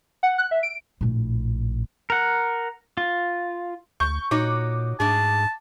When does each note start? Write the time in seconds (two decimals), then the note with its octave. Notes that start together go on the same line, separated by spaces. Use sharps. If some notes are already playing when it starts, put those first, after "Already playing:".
0.23 F#5
0.38 F#6
0.51 E5
0.63 D7
1.01 A#1 A2
2.10 A#4 F#5
2.97 F4
4.00 D2 C#6 G6
4.31 A#2 D#4 F#4 C#5 D6
5.00 G#2 A3 D4 G#4 A5